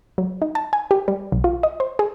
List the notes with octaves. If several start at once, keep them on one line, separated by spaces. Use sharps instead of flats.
F#3
D#4
A5
G#5
G4
G3
B1
F4
D#5
C5
G#4